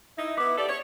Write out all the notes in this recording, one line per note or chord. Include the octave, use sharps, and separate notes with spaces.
D#4 E4
B3 E4 D6
G4 A4 D5
C#5